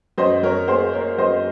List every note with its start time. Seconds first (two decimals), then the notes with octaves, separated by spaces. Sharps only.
0.18 F#2 C5 D#5
0.43 F#2 A#4 C#5
0.68 A#3 G#4 C5
0.93 A#3 A#4 C#5
1.18 F#2 C5 D#5